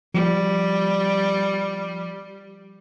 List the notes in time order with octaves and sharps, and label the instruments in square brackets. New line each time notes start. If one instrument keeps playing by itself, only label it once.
[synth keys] F3 [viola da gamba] G3